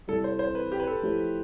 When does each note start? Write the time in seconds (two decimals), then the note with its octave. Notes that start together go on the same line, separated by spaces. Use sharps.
0.08 C3 G3 C4 E4 A4
0.24 C5
0.39 C5
0.55 B4
0.72 G4
0.79 B4
0.87 A4
1.02 F3 A3 E4 G4 C5